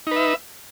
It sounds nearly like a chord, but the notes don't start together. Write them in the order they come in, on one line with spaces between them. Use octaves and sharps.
D#4 B4 E5